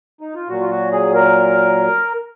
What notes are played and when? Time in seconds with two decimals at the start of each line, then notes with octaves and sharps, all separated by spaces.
0.21 D#4
0.35 F4
0.48 A#2 F#3 F#4
0.60 F4
0.70 F#4
0.92 G#4
1.14 A#4